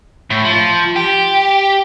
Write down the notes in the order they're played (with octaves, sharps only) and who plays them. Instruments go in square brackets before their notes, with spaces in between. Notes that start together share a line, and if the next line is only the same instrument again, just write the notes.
[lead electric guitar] A2
F3
G4